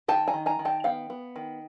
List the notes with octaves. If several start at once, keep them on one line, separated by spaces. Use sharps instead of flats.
D#3 G5 A5
G#5 A#5
D#3
G#5 A#5
D#3
G5 A5
B3 F5 G5
B3
D#3